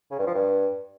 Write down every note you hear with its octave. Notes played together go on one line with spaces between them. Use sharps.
C#3
G2
F3
G2